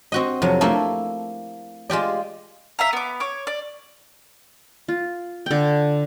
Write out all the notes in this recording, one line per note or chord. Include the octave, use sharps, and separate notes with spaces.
C4 F#4 D#5
F2 C3 F#3
A3 A#3 E4 A4
G#3 F4 G4 D5
E5 F5 A#5
B3 D6
C#5 D6
D5
F4
D3 G5